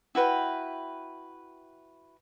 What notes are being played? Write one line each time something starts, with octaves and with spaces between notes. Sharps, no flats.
E4 F#4 B4 G5